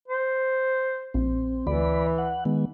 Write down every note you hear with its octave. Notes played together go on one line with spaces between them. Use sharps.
C5
A#1 C4
D2 E3 D5 B5
F#5
D#3 G#3 B3